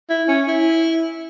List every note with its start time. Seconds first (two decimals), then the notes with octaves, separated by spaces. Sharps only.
0.09 E4
0.28 C#4
0.47 E4